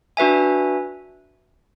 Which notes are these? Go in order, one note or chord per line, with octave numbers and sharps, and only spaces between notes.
D4 F#4 B4 E5 G#5